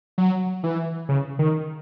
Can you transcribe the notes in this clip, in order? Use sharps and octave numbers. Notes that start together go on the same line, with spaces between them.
F#3
E3
C#3
D#3